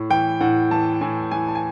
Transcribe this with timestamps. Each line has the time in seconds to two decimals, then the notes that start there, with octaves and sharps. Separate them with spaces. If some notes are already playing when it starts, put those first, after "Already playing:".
Already playing: A2
0.10 E3 G5
0.41 A2 F#5
0.71 E3 A5
1.01 A2 G#5
1.31 E3 G#5
1.48 A5
1.55 G#5